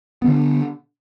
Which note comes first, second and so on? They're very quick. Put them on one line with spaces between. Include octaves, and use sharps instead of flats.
B3 D3 D4